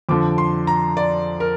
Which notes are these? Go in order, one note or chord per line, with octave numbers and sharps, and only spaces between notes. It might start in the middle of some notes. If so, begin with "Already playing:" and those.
F2 D3 F3 D6
C6
A#5
D5
A#4